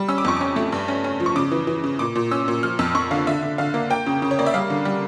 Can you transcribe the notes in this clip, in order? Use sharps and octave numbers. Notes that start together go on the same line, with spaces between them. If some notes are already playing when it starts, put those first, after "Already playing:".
Already playing: G3
C#4 E6
D6
F2 C#6
C#4 D6
A3
G2
C#4
C#4
F3
C#6
C#3 D6
E3
E3
C#3
A#2 D6
A#2
C#4 E6
A#2
F3 F6
F2 E6
F2 C#6
D3 F5
D3 E5
D3
D3 F5
A#3
A#3 G5
C#3
C#3
C#5
A#3 D5
E5
G3 F5
D3
G3